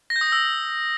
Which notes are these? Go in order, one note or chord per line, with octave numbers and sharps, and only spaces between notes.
A#6
G6
D#6
A#6
E6